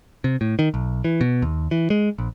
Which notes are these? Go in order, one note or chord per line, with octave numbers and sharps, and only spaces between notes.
C3
A2
D#3
B1
E3
B2
D#2
E3
G#3
A#1